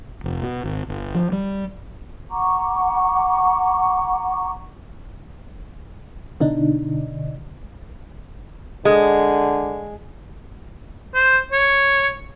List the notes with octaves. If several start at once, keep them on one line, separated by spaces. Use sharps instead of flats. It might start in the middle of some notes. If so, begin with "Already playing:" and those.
F1
B2
G#1
G1
F3
G3
F#5 A#5 C#6 D6
B2 D3 D4 D#4
D3 G#3
C5
C#5